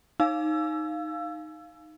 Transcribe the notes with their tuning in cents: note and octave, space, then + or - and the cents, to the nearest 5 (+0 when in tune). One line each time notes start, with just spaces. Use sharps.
D#4 +0 F5 +0 E6 +20